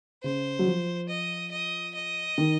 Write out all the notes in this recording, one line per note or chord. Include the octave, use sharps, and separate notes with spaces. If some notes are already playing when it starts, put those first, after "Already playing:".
C#3 C5
F#3
F3
D#5
D#5
D#5
D#3